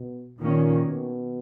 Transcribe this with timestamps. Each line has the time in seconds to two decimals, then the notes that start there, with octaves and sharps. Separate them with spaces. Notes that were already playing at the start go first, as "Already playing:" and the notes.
Already playing: B2
0.39 A#2 D#3 A#3 C#4
0.85 B2